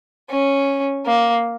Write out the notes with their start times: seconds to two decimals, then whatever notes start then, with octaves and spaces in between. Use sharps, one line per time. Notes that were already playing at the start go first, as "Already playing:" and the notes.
0.30 C#4
1.06 A#3